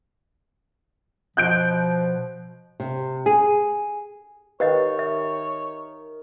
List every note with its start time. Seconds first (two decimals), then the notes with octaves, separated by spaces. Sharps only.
1.37 B2 F3 F#6 G6 D7
2.80 C3
3.26 G#4
4.60 D#3 G4 B4 C#5 D#5 F5
4.99 E5